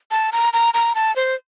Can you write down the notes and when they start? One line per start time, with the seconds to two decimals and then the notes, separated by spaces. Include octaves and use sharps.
0.11 A5
0.32 A#5
0.53 A#5
0.74 A#5
0.95 A5
1.16 C5